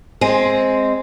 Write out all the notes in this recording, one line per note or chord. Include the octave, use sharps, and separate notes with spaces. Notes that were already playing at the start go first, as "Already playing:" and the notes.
G#3 C4